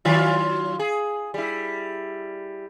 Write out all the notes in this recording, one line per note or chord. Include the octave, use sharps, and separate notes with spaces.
D#3 F#3 F4
G#4
G3 E4